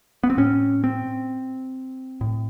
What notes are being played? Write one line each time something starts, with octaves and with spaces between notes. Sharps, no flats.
B3
C4
A2 C#4
C4
A2